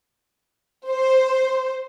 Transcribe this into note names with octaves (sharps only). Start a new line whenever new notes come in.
C5